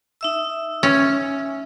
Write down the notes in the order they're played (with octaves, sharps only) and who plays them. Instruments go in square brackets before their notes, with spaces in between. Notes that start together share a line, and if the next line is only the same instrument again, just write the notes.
[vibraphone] D#4 E5 E6
[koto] C#4